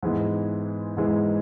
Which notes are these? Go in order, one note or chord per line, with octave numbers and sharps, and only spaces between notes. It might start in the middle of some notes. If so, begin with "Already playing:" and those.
G#2 E3 G#3 B3
G#2 E3 G#3 B3